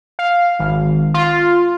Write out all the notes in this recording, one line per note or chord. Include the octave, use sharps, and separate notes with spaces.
F5
G#1
F4